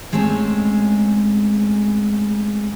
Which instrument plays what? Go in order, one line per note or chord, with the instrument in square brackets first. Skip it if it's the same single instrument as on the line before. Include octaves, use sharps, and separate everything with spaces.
[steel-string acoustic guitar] G#2 G#3 A3 C4 C#4 A5